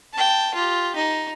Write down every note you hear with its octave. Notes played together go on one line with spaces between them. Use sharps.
G5 A5
F4 G4
D#4